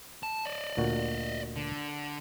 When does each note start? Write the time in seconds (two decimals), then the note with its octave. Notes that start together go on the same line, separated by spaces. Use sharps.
0.23 A5
0.46 D5 D#5
0.77 D2 A#2 F#4
1.56 D3